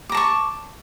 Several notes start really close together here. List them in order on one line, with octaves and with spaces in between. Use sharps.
D6 A#5 A5 C#6